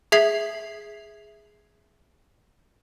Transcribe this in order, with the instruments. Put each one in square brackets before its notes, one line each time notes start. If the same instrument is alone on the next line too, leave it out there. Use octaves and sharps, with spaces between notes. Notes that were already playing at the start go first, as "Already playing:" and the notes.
[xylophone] G#4 E5 G#6 B6 C7 F#7